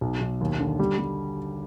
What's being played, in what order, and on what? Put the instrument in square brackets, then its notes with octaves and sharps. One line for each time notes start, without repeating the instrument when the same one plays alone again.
[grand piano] B1
B1
D#2
D3
G3
G3